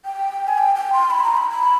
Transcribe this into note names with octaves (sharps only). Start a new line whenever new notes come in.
G5
G#5
G5
G5
C6
B5
A#5
B5
B5